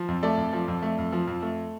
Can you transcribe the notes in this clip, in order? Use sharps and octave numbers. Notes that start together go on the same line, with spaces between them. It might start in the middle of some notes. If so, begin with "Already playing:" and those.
Already playing: F3
F2
A3 A4 D5
F2
F3
F2
A3
F2
F3
F2
A3